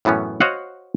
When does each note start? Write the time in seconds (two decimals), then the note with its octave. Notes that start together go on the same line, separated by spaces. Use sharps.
0.05 F#2 A2 E3 B3 C#4
0.41 F#4 C5 C#5 D#5 F5 F#5